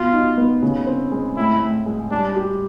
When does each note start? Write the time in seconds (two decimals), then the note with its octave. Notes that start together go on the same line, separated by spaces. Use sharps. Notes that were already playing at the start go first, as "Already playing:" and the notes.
Already playing: B2 F4
0.13 D#4
0.37 B3
0.62 C#3
0.87 C4
1.12 G#3
1.37 A2 E4
1.61 A2
1.86 G#3
2.11 G3 D4
2.36 G4